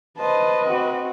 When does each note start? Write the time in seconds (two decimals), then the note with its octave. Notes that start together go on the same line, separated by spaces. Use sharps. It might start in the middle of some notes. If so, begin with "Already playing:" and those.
0.18 B4 C5 D#5 A5
0.65 C4 F#4